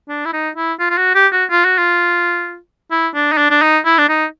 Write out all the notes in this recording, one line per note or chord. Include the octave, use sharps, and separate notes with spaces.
D4
E4
D#4
E4
F4
F4
F#4
G4
F#4
F4
F#4
F4
E4
D4
D#4
D4
D4
D#4
E4
D4
D#4